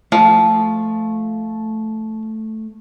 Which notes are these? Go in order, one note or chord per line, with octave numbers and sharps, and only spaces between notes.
F3 A3